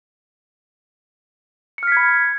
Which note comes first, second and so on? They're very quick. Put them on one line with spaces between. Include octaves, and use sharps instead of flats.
C#7 F6 B6 G#6 B5